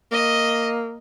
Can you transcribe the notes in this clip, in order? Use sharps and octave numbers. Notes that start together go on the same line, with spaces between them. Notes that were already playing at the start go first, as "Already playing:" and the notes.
A#3 D#5